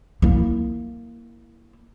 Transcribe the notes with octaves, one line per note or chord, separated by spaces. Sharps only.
A#3 E4